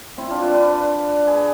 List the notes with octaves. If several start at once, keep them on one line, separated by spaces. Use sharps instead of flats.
C4 E4
D4 F4
B4 D5
B4 D5
G#4 B4